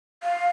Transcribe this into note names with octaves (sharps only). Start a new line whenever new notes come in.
F5